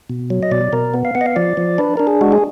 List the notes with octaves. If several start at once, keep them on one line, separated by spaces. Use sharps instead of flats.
B2
F#3
D#5
B2 D5
B2 A#4
B3
F5
B3 F#5
D#5
F5
F3 D5
F3
D4 B4
D4 A#4
G#4
G#3 F#4
G#4